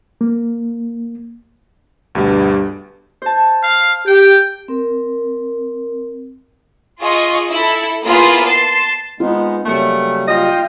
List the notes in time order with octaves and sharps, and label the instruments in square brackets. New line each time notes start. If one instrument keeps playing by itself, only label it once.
[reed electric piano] A#3
[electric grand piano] D2 B2 [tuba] G2
[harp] C5 A5
[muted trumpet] F5
[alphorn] G4 [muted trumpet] G5
[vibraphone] C4 A#4
[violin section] F4 G#4 D#5 C#6
E4 A4
A#3 B3 E4 F4 G#4 B4
A5 C6 C7
[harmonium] G#3 B3 D#4 [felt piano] C4 F4
[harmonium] C#3 F#3 G3 [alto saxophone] A3 [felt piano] A#3 C#7
[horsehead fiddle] F4 G5 [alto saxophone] D#5